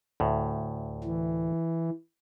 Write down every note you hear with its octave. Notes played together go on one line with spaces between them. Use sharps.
D2 A2
E3